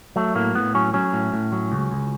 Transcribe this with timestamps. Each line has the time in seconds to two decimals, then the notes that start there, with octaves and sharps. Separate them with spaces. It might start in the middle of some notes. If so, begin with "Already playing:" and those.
0.16 F#3 A3
0.35 A2 A#3
0.55 A2 B3
0.75 F#3 C#4
0.94 F#3 C#4
1.13 A2
1.33 A2
1.52 F#3
1.72 C#2
1.91 C#2